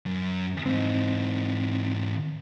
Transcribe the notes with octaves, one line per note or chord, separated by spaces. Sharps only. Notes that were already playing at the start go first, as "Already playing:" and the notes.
F#2
G#2 E3 C4 D#4